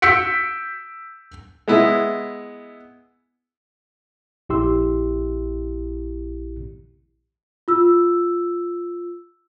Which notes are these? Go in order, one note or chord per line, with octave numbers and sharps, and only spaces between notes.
E6 G6 B6 C#7 D7
G#3 B3 E4
A#1 E4 G4 C6 E6
F4 E6